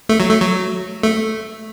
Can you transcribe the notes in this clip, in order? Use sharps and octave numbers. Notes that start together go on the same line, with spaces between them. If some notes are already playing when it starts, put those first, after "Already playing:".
A3
F#3
A3
F#3
A3